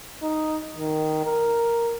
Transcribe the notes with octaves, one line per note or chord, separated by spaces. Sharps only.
D#4
D#3
A#4